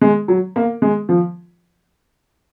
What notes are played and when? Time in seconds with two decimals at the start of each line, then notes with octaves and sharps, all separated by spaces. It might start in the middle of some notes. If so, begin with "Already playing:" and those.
0.01 G#3
0.28 F#3
0.56 A#3
0.82 G#3
1.09 F3